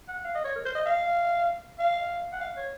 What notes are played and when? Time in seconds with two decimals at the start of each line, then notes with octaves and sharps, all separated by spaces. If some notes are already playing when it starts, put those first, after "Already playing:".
0.08 F#5
0.24 F5
0.34 D#5
0.44 C#5
0.55 A#4
0.65 C5
0.75 D#5
0.86 F5
1.79 F5
2.32 F#5
2.40 F5
2.56 C#5